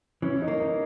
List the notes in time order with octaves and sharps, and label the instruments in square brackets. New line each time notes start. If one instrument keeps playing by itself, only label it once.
[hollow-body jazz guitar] E3 [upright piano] C#4
[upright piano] D#4
[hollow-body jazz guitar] A#3
[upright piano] D#4